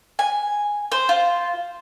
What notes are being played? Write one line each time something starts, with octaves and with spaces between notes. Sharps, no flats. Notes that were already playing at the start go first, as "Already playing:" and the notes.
G#5
C5
F4